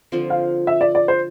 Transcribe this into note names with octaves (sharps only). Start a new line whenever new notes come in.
D3 F3 C4 F4
F5
E5
D5
D5
C5